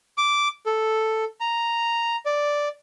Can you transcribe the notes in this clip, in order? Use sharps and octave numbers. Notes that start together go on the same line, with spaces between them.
D6
A4
A#5
D5